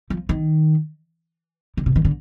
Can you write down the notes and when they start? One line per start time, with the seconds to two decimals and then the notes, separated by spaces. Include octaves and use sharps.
0.10 F3
0.29 D#3
1.77 D3
1.86 C3
1.96 D#3
2.05 D3